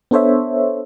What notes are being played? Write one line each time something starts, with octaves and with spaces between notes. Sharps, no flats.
B3 D4 A4 C5 C#5 E5